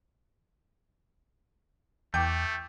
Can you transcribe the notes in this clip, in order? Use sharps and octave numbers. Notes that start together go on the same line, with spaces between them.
E2 A3 G5 D6 G6